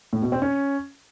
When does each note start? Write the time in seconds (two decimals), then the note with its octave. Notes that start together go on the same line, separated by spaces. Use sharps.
0.13 A2
0.22 B2
0.32 C4
0.42 C#4